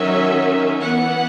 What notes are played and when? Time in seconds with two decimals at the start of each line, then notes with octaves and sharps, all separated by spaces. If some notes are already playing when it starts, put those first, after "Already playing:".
Already playing: D#3 F#3 C#4 E5
0.80 E3 B3 F#5